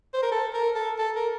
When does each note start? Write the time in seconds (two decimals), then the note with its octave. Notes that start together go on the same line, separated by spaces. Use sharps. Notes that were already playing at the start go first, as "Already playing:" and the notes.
0.14 C5
0.23 A#4
0.32 A4
0.54 A#4
0.76 A4
0.99 A4
1.16 A#4